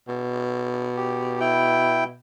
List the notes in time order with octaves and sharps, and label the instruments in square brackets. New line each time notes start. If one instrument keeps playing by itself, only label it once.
[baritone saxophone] B2
[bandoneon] G4
E4 G5